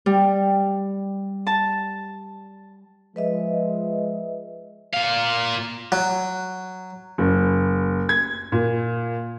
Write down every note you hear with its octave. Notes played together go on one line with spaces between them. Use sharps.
G3
A5
F3 G#3 B4 D#5 E5
A#2 F5
F#3
F#1
G#6
A#2